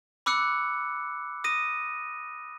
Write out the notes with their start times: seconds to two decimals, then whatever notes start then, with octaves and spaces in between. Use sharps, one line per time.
0.26 B5 D6 E6 F#6 C#7
1.44 D#6 A#6 D#7